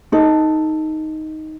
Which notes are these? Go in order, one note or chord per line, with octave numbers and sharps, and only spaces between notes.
D#4 A4